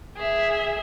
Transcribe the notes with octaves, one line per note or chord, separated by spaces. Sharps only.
G#4 E5